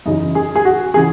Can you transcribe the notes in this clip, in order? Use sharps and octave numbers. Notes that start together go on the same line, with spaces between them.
F#2 C#3 E3 D#4
G#4
G#4
F#4
C#3 E3 G#4